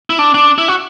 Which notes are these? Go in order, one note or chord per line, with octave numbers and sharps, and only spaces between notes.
E4
D4
D4
E4
F#4